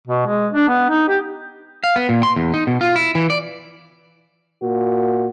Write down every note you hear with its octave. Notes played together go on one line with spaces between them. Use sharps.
B2
G#3
D4
B3
D#4
G4
F5
B3
A#2
C6
E2
D#4
B2
F4
E4
E3
D5
A#2 F#4